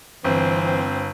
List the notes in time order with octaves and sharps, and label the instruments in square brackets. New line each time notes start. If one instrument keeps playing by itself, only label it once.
[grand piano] G1 [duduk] E3 [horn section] C4